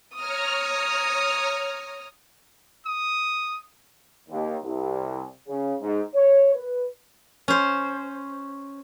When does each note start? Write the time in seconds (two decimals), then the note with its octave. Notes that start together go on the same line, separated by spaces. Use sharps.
0.14 C#5 A#5 D#6 F6
2.86 D#6
4.29 D#2
4.63 C2
5.48 C#3
5.80 G#2
6.13 C#5
6.54 B4
7.48 C#4 C5